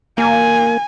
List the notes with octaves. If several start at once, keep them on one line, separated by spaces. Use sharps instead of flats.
A#3 G#5